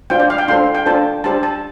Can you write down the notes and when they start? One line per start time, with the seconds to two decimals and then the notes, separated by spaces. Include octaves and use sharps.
0.10 D4 F4 C5 G5
0.20 D5
0.30 F5
0.38 G5
0.48 D4 F4 A4 C5 C6
0.75 G5
0.86 D4 F4 A4 C5 A5
1.24 D4 G4 C5 A5
1.43 A5